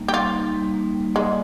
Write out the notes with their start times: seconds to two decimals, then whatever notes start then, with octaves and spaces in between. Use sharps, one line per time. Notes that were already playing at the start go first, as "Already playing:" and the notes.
Already playing: G3 A#3 D#4
0.08 G4
0.13 G3 F4
0.34 D#4
0.54 G3
0.74 A#3
0.94 G3
1.15 G#3 D5